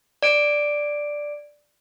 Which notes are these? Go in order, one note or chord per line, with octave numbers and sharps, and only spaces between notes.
D5 D7